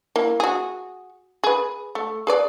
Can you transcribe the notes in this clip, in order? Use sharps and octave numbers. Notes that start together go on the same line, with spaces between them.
A#3 E4
F#4 G#4
G#4 B4
A3
G#4 B4 D5